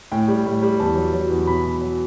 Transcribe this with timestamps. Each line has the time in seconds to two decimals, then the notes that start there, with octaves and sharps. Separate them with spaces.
0.12 A2 G5
0.28 G3
0.46 A2
0.63 G3
0.80 E2 A5
0.96 F#3
1.13 F#3
1.30 E2
1.47 B2 B5
1.65 B2
1.81 F#3